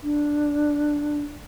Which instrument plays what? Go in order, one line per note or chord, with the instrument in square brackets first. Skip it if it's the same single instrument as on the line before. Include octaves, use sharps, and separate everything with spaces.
[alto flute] D4